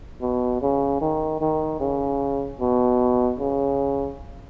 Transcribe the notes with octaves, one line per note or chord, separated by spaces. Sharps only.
B2
C#3
D#3
D#3
C#3
B2
C#3